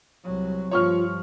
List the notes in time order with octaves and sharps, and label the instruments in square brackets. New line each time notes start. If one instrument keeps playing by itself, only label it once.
[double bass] C2 F#3
[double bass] G2 F3 [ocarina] F4 [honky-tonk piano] C#5 C#6 F6